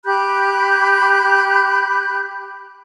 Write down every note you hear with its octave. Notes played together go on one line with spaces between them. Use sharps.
G4 B5 F#6 G6